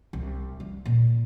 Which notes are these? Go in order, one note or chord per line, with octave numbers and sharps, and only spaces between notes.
C2
G3
A#2